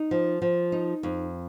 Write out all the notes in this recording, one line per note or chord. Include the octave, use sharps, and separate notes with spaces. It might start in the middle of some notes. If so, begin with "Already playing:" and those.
Already playing: D#4
F3
F3
D#4
F2